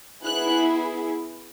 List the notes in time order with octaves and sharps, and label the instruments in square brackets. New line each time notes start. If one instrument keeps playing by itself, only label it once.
[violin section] B3 E4 G#4 F#6